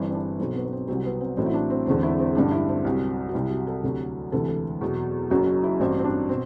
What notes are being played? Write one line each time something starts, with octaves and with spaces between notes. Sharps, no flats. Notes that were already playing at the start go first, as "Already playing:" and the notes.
Already playing: G1 G2 E3 C4
C4
D4
B1 B2 F#3 C4
B3
B3
C4
C2 C3 F#3 C4
B3
C4
A1 A2 F#3 C4
E4
D4
C4
E1 E2 D3 C4
E4
C4
A1 G2 D3 D4
E4
C4
C2 C3 F#3
F#4
C2 C3 F#3 E4
F#4
A4
D2 C3 F#3
E1 D2 C3 E3 A4
A4
E2 B2 F#3
F#1 F#2 F#3 F#4
F#4
E4
A1 G2 F#3 C4
C4
D4
B2 C4